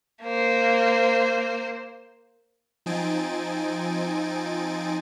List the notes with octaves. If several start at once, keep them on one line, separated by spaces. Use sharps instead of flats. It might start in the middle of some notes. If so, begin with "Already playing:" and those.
A#3 C5
F3 C4 D#4 G#5 A6 D7